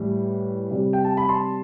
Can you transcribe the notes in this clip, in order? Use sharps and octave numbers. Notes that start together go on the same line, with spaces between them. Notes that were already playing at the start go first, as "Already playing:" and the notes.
Already playing: A2 E3 G3
C3 G3
G5
A5
B5
A5 C6